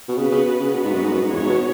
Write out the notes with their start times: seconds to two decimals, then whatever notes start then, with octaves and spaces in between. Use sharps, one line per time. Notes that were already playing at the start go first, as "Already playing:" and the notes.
0.09 B2
0.17 C#3 B3 F#4 B4
0.32 C#3
0.45 B2
0.60 C#3
0.73 B2 B3 F#4 B4
0.84 G#2
0.93 F#2
1.03 G#2
1.12 F#2
1.22 G#2
1.31 E2 B3 F#4 C#5
1.41 G#2
1.49 B2